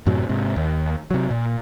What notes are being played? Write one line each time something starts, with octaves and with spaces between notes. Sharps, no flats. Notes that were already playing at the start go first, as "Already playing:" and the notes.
F#2 A2 C3 F#3
G#2 C3
D#2
C3 F#3
A#2